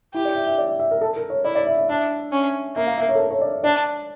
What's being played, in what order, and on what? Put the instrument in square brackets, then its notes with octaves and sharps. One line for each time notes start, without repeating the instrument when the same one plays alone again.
[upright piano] E4 [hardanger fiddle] G4
[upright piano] D5
E5
E5
D5
E5
E5
A#4
A4
A#4
C#5
[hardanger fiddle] E4 [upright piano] D5
[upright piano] D5
E5
E5
[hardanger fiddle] D4 [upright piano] E5
[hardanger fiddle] C#4
[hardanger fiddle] A#3 [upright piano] E5
[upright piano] F5
E5
C#5
A4
A#4
C#5
D5
[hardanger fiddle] D4 [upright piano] D5